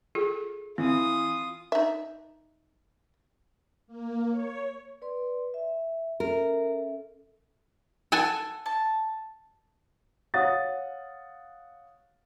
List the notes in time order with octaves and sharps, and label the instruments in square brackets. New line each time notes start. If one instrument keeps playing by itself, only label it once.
[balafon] F4 G#4 A4
[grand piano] E3 [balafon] C4 [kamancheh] F4 D#6
[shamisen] D#4 E5
[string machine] A#3
C#5
[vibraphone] B4 D5 C6
E5
[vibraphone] C#4 A4 E5 [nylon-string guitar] A#4
[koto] A4 F#5 G#5
[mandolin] A5
[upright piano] C#5 F5 F#5 D#6 A6